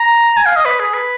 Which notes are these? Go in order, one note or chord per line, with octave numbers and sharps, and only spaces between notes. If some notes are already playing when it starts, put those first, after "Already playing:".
Already playing: A#5
G#5
F5
D#5
B4
G#4
B4